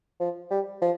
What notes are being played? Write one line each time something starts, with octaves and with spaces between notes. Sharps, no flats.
F3
G3
F3